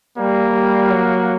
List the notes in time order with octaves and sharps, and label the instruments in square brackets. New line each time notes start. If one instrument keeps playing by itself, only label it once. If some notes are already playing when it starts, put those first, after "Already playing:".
[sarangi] G3 [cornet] A#3
[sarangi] G3
F#3